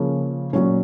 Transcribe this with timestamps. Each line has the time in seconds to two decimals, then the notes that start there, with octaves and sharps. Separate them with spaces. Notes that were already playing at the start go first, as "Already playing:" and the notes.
Already playing: C#3 F3 A#3 C#4
0.53 A#2 F#3 C#4